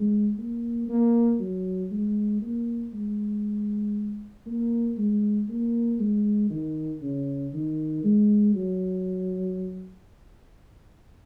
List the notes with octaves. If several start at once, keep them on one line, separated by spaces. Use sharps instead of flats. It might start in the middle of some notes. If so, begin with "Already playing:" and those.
Already playing: G#3
A#3
A#3
F#3
G#3
A#3
G#3
A#3
G#3
A#3
G#3
D#3
C#3
D#3
G#3
F#3